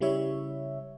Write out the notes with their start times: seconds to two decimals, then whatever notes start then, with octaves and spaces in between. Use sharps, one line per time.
0.01 C#3 G3 E4 C#5 E5